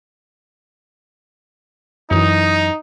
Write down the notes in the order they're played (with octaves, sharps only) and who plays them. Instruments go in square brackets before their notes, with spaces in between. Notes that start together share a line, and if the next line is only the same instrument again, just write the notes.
[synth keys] F#2 E3 [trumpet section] D#4